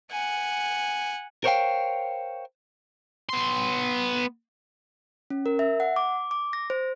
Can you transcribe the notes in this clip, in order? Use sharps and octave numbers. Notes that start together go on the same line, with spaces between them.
F#5 G#5
A#4 C5 C#5 E5 F5 G5
B3 C6
C#4
A#4
E5
F#5
D6
D6
A#6
C5